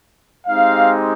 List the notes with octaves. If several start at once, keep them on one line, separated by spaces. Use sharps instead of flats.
G#3 C4 D#4 G4 F5